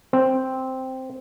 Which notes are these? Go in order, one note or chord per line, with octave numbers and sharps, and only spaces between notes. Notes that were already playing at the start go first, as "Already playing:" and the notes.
C4